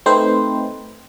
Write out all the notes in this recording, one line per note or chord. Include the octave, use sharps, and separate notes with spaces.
A3 C4 D#4 B4 C5